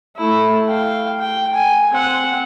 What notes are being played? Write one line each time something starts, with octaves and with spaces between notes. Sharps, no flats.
A3 E4
F5 G5
G5
G#5
C4 F#5